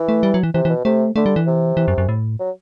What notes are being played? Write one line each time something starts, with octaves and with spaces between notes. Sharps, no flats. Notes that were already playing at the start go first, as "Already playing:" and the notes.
Already playing: E3
A3
G3
F#3
E3
C3 E3
E3
B2
C3 A3
D3 A3
G3
E3
C3
E3
F#2
F#2
A2
F#3